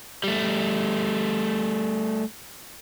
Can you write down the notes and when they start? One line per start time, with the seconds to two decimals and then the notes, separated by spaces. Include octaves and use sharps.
0.24 G3 A3